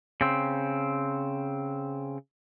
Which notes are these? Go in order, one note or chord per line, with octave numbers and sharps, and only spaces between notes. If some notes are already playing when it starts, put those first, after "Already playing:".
C#3 C4